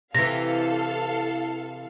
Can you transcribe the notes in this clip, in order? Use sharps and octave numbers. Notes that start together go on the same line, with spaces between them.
C3 E3 A4 F5 A#6